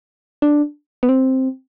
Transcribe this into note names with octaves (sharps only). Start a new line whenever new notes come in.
D4
B3
C4